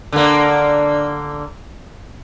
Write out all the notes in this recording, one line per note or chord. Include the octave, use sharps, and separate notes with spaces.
D3 A#3